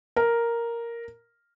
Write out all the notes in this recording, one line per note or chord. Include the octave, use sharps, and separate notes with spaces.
A#4